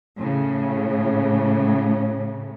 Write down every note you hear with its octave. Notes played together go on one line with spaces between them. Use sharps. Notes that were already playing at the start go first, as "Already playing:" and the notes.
A2 C#3